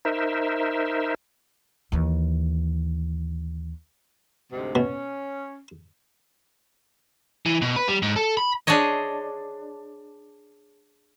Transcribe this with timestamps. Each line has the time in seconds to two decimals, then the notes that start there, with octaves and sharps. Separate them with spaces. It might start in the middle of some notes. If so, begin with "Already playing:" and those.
0.05 D#4 A#4 C5 E5
1.92 D#2 E3
4.52 D2 G#2 C3
4.75 B2 C#4
7.46 E3
7.62 B2
7.76 B4
7.88 G3
8.02 G#2
8.16 A4
8.37 B5
8.67 D4 G#4 C5 C#5 D#5